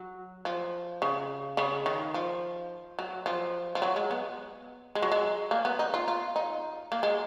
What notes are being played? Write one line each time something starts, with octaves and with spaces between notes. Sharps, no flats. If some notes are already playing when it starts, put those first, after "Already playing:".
Already playing: F#3
F3
C#3
C#3
D#3
F3
F#3
F3
F3
F#3
G#3
B3
G#3
F#3
G#3
A#3
B3
D#4
F4
F4
D#4
A#3
G#3